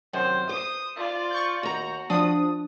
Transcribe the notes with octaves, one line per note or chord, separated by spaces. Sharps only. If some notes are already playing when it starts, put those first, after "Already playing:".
F#2 C3 D#3 C5
C5 D#6
F4 D5
C#6 G6
D#2 F#4 A#5
F3 D4 D#6